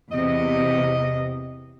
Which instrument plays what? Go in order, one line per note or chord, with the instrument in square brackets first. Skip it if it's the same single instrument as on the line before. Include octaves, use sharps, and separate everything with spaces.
[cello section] E2 C3 [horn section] D#5